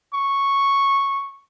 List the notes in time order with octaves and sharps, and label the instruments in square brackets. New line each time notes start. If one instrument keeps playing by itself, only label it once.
[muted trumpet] C#6